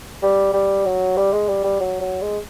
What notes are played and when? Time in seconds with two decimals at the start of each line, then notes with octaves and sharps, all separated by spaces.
0.22 G3
0.54 G3
0.85 F#3
1.17 G3
1.33 G#3
1.48 G3
1.64 G3
1.80 F#3
2.01 F#3
2.22 G#3